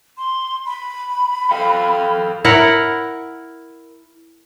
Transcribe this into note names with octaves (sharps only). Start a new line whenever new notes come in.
C6
B5
A4 F5 G5
E4 A#4 F#5